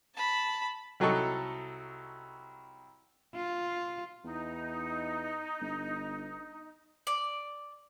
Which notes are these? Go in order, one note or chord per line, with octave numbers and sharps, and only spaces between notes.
A5 B5
C2 F#3 D#4 A4 C#6
F4
E2 D#4
G1
D5